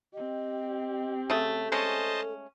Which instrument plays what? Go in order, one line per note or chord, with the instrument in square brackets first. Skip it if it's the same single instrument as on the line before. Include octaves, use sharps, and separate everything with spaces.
[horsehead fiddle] C4 G4 [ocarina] D#5
[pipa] C#3 A3 [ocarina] A4
[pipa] G#3 A3 C#4 [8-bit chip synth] C5 D#5 A5